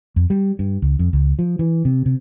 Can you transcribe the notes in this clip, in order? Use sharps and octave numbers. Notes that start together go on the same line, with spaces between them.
F2
G3
G2
C#2
F2
C#2
F3
E3
C3
C3